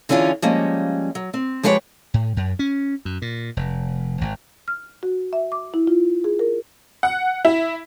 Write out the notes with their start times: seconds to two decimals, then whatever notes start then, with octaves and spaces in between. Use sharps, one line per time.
0.09 D3 E3 C#4 D4 F4 G#4
0.42 F3 G3 G#3 A#3 C#4
1.15 F#3
1.34 C4
1.63 F3 G#3 G4 B4 C#5
2.14 A2
2.37 F#2
2.59 C#4
3.05 F#2
3.22 A#2
3.57 F1
4.21 G#1
4.68 F6
5.03 F#4
5.33 E5
5.52 D6
5.74 E4
5.87 F4
6.24 G#4
6.39 A#4
7.03 F#5
7.45 E4